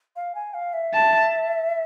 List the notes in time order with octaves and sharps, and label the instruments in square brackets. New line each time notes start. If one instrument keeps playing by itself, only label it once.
[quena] F5
G#5
F5
E5
[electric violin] A5